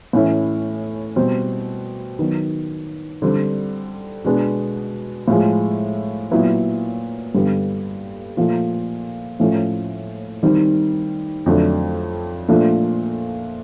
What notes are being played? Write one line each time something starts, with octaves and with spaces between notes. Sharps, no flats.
A2 E3 A3 C#4 E4
B2 G3 C4
D#3 F#3 B3
D3 G3 C4
B2 G#3 B3 D4
A2 F3 G#3
A#2 F#3 B3 E4
G2 D3 G3 B3
A#2 F3 A3
A2 F3 A3 C#4
D#3 G3 C4 D#4
F2 D3 F#3 A3 D4
A#2 F3 A3 D4